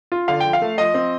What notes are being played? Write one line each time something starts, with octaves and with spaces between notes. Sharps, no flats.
F4
D3 F5
F3 G5
F5
A3
F3 D#5
C4